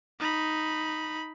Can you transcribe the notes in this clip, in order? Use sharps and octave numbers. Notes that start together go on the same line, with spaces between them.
D#4 B5